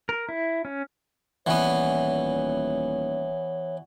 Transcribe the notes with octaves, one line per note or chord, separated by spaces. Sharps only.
A#4
E4
C#4
D#1 E3 B3 C#5 D5 F#5 C#6